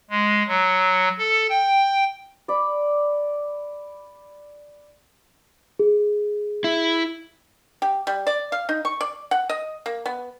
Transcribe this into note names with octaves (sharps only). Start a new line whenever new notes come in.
G#3
F#3
A4
G5
D5 B5 D6
G#4
E4
G4
G3
D5
F5
D#4
C#6
D5
F#5
D#5
A#3
B3